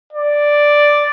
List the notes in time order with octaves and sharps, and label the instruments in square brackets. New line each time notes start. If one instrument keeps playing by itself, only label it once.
[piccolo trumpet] D5